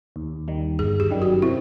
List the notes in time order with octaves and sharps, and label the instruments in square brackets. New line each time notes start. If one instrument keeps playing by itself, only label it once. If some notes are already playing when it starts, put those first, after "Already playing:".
[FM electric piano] D#2
D#3 G3
[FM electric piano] G1 [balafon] G#4
[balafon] G4
[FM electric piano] F#2 D#3 G3
[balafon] F#4
[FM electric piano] C3 [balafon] E4